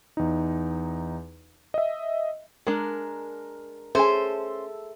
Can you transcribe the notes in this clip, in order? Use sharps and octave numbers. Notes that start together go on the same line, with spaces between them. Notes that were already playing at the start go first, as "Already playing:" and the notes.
E2 D#4
D#5 E5
G#3 D4 A#4
C#4 G#4 A4 C5 E5 G#5